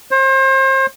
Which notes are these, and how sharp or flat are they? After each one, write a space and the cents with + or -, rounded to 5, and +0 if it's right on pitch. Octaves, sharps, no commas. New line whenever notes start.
C5 +35